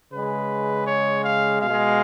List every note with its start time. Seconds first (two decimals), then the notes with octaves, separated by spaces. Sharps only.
0.13 C#3 G#3 B4
0.87 C#5
1.24 F5
1.62 B2 G#3 F5